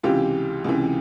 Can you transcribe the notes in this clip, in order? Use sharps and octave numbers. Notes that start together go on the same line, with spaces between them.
C#2 C3 E3 F4 G4
C#2 C3 E3